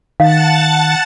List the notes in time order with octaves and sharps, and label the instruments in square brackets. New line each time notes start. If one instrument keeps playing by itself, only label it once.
[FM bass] D#3 [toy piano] F5 [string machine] F#5 A5 A6